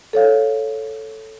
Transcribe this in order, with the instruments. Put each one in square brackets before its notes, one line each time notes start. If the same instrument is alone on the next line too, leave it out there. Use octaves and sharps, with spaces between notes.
[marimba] A4 C#5 F5